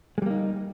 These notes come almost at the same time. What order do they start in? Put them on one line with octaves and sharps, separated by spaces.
G#3 G3 A#3 D#4